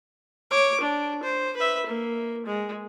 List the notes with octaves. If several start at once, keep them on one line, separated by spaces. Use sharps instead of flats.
C#5 D6
D4
C5
B4 E5
A#3
G#3